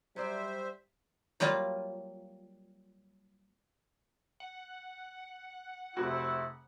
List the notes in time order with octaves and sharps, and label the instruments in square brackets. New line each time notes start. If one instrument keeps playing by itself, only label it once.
[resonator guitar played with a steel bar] F#3 D5 [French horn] G3 [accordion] C5 E5
[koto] F#3 G3 A#3 F4
[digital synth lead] F#5
[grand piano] F1 F#4 [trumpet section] A3 C4 E4